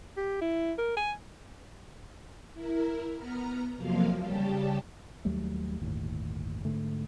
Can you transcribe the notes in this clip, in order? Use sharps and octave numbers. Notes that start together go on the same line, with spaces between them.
G4
E4
A#4
G#5
E4 A#4
B3 A#5 F6
F2 C3 F3 F#3 A#3 F5
C#3 G3 G4 A5
D#2 F#3 G3 A3
G1 D#2 A2
G#2 D3 A3